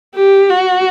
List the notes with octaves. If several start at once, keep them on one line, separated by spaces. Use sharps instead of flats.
G4
F#4